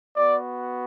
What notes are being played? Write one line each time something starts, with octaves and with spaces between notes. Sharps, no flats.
B3 F#4 D5